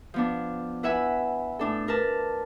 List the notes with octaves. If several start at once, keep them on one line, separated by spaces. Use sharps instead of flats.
F3 B3 D4
E4 B4 E5 F#5 G#5 B5
A2 D4 A4
D4 A#4 B4 A5